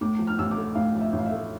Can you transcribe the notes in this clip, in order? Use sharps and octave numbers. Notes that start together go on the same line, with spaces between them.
A2 D6
F3
F6
A1 E6
D6
A3
A2 F5
F3
E5
A1
F5
E5
A3